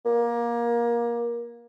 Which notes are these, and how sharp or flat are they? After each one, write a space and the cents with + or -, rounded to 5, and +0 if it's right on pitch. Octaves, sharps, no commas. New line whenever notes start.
A#3 +20